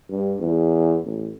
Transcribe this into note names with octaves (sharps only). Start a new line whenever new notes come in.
G2
E2
A1